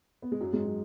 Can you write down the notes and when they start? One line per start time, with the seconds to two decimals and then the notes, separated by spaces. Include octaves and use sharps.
0.22 B3
0.32 G#3
0.41 F#2 F#3
0.53 G#2 G#3
0.66 F#3